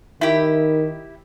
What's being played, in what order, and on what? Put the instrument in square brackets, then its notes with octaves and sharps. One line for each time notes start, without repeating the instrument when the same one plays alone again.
[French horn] D#3 [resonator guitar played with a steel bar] E4 G4